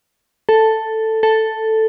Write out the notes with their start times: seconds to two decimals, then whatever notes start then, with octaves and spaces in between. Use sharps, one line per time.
0.49 A4
1.23 A4